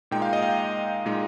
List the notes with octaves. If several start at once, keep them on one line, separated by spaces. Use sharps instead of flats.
A#2 G#3 D#4 G5
F5
D#5
F5
A#2 G#3 D#4